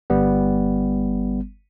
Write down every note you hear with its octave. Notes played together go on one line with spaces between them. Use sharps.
G1 G3 B3